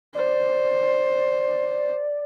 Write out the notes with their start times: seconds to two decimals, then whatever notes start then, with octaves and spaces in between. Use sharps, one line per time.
0.15 C5 D5